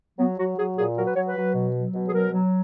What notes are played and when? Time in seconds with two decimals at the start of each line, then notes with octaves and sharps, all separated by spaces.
0.19 F#3 B3
0.39 F#3 F#4
0.58 F#3 G#4
0.78 A#2 G#4
0.97 F#3 A#4
1.06 B4
1.16 F#3 C#5
1.27 B4
1.36 F#3
1.55 B2
1.75 F#3
1.94 B2
2.09 G#4
2.13 F#3 A#4
2.32 F#3